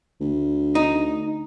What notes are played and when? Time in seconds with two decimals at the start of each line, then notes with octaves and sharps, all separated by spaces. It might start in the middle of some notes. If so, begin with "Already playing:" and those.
0.21 D2
0.75 D#4